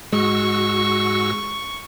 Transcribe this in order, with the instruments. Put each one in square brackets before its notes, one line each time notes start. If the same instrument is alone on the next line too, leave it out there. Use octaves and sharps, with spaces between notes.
[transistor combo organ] G#2 [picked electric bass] G#3 [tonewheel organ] F#4 E6 [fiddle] C#6